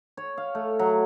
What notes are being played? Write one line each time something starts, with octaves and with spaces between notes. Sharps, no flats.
C#5
F5
A3
F#3